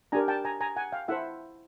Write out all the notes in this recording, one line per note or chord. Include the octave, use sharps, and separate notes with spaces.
D4 G4 A#4 G#5 A#5
G5 A5
G#5 A#5
G#5 A#5
F#5 G#5
F5 G5
E4 A4 C5 E5 F#5